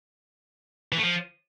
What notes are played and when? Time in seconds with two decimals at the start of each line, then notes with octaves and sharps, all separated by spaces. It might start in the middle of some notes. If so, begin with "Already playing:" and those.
0.92 E3
0.98 A3
1.03 F3